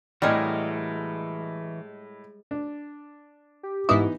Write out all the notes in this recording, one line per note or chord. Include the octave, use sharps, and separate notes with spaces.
A2 E3 G3 G#3 F#4 A#4 D#5 F6
D4
G4
G#2 E3 B3 D#4 E4 D6 D#6